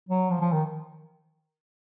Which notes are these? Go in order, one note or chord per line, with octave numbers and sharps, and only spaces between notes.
F#3
F3
F3
D#3